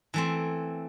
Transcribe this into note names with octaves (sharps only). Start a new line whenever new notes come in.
E3 A3 C4